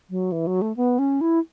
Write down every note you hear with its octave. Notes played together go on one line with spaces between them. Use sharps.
F#3
E3
F#3
A3
B3
C#4
E4